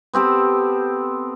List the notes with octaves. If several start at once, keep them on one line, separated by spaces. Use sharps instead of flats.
B3 C4 G4 A4